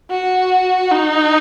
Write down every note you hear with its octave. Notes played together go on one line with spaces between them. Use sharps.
F#4
D#4